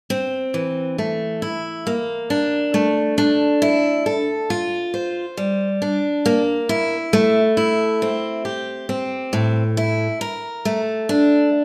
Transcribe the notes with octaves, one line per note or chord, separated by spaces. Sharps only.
C4
E3
A3
E4
A#3
D4
A3
D4
E4
A4
F4
C5
G3
D4
A#3
E4
A3
E4
C4
G4
C4
A2
E4
A#4
A3
D4